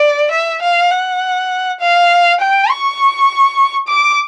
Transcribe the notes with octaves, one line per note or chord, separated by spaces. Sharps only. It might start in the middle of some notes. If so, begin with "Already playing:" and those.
Already playing: D5
E5
F5
F#5
F5
G5
C#6
D6